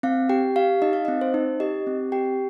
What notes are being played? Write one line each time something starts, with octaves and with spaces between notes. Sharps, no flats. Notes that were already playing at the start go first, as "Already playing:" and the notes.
C4 F5
G4 G5
G4 F5
D#4 D#5
F5
C4 D#5
C5
D#4
G4 D#5
C4
G4 G5